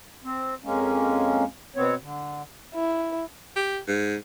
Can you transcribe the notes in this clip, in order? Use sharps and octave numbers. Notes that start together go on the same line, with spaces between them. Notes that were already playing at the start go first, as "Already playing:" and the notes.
C4
F2 G#3 A#3 C#4
B2 B3 C4 C#5
D3
E4
G4
G#2